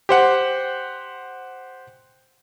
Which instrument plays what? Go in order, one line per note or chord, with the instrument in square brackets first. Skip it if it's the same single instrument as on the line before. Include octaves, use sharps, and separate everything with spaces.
[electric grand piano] G4 C5 F#5